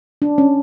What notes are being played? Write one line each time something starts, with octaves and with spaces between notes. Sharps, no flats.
D4
C#4